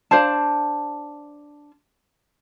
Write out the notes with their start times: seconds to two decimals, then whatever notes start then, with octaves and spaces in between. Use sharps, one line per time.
0.11 D4 C5 F5 A5